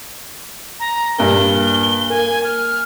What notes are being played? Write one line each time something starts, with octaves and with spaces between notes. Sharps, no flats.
A#5
G2 A#2 G7
A#3 G#5
F6